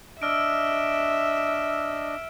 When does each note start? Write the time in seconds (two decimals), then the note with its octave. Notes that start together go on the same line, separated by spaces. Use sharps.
0.22 D4 D#5 E5 E6 F6 D7